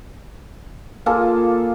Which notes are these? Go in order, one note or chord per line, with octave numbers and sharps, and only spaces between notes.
A#3 F4 G#4 A4